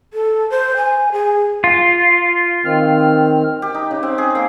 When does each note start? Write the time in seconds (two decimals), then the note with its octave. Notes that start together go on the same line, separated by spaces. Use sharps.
0.13 A4
0.51 C5
0.77 G#5
1.12 G#4
1.64 F4
2.65 D#3 C4 F6
3.62 G4
3.74 D#4
3.91 C#3
4.03 C4
4.18 G#4
4.35 A#3